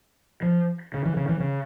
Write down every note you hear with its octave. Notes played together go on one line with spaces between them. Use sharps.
F3
C#3
E3
C#3
E3
C#3